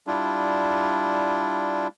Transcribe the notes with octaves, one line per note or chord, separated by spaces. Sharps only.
G3 D4 E4 F4